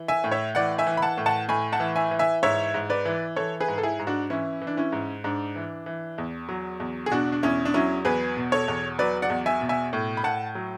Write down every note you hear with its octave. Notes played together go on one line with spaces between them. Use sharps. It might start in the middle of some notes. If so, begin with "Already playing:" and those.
Already playing: E3
E5 G#5
A2
C#5 E5
E3 D5 F#5
E5 G#5
E3
B5
F#5 A5
A2
F#5 A5
A2 G#5 B5
F#5 A5
E3
E5 G#5
E3
E5 G#5
G#2 C#5 E5
G#2
B4 D5
E3
E3 A4 C#5
G#4 B4
G#2
A4
E4 G#4
G#2
D4 F#4
E3 C#4 E4
E3
D4
C#4 E4
G#2
G#2 D4
E3
E3
E2
F#3
E2
G#4
B2 D4 F#4
D4
E2 C#4 E4
D4
F#3 C#4 E4
E2 G#4 B4
B2
A4 C#5
E2
F#3 B4 D5
D5 F#5
E2
E5 G#5
B2
E5 G#5
A2
B5
A2 F#5 A5
F#3